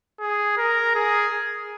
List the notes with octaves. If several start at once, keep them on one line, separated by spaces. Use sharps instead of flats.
G#4
A#4
G#4